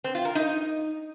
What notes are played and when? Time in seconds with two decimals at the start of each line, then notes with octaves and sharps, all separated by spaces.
0.04 C4
0.15 F4
0.25 A#4
0.35 D#4